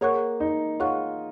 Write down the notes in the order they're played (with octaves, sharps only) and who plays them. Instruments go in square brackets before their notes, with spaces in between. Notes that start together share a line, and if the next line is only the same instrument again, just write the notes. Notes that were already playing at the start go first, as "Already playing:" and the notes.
[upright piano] A#3 [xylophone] G#4 C#5 F#5 C#6 F#6
[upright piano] D#4
[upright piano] F4 [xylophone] G#4 C#5 F#5 C#6 F#6